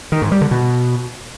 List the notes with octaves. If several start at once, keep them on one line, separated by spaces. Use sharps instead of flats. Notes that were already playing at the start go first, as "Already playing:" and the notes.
D#3
G#2
G3
D3
B2